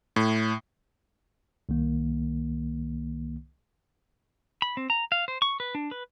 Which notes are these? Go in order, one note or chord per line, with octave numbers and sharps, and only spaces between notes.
A2
C2 D#3 A#3
B5
C4
A#5
F5
C5
C#6
B4
D4
B4